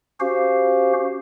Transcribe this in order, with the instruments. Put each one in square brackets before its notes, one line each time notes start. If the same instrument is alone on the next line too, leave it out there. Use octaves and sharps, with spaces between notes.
[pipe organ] C#4 F#4 G4 C5 F5